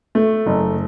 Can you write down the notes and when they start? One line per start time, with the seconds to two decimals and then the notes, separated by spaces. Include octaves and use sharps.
0.15 A3
0.46 F#1